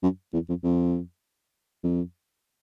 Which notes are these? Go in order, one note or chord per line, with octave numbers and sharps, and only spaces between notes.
F#2
E2
F2
F2
F2